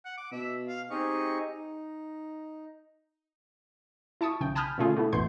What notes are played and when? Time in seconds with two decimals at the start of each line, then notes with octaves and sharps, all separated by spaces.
0.05 F#5
0.17 D6
0.32 B2 E5
0.68 F5
0.90 C4 D#4 G4 G#4 D#5 C#6
1.50 D#4
4.21 E4 A5 C#6 D#6
4.40 B1 C#3 G5
4.55 G#5 A5 B5 D#6 F6 G6
4.78 B2 D3 A3 C#4 F4 G#4
4.97 A3 B3 E4
5.13 A1 E2 B2 B3 C6 G6